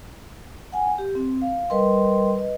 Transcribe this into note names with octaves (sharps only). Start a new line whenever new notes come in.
F#5 G#5
G4
C4
F5
G3 A#4 B4 D#5 G5 C6
B4 D#5